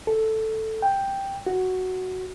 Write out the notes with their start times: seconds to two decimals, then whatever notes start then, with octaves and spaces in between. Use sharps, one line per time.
0.07 A4
0.82 G5
1.47 F#4